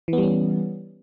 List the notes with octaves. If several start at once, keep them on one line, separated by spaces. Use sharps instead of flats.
E3 G3 B3 C#4